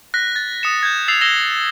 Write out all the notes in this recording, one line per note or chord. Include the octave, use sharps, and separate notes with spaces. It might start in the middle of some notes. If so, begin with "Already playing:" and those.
F#6 A#6 B6
A6
D#6 C#7 E7
G6 G#6
E6 A6 C7 F7
E6 A#6 C7 E7 F7 G7